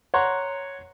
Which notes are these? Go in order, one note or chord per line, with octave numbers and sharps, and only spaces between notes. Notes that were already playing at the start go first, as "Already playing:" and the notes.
C#5 F#5 A#5 C6 C#6